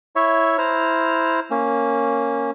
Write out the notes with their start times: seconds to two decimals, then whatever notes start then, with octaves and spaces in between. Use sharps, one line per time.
0.16 E4 C#5 E5 C#6
0.58 E4 C5 A#5 F6
1.51 A#3 C#4